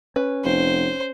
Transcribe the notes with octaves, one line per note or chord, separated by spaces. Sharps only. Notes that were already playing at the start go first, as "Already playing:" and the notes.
C#4 B4
F1 C5